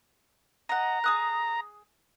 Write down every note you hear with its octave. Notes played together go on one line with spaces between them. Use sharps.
D#5 F#5 A#5
G#4 D#6 F#6